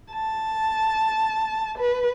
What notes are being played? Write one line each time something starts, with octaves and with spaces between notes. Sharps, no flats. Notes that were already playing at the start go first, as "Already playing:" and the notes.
A5
B4